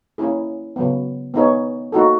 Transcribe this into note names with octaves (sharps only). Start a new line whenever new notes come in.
A#3 C#4 E4 G#4
C#3 F#3 B3
B3 D#4 G#4 C#5
A#3 D#4 F#4 A4